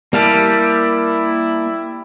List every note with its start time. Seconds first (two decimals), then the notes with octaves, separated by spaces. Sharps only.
0.13 G3 A#3 E4 F5 A5